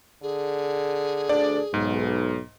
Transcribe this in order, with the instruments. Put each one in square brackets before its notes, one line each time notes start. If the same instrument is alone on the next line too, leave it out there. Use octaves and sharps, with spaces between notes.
[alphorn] D3 [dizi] G#4
[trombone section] D2 D4 A4 [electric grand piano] D5
[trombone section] B1 [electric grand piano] G#2